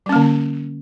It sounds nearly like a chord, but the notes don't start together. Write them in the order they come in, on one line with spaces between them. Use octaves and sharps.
G3 C#4 A#3 D3